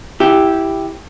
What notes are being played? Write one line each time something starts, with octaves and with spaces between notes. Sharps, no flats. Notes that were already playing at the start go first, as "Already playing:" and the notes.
E4 G4